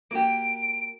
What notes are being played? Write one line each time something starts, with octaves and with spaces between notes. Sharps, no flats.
A#3 F#4 G4 D7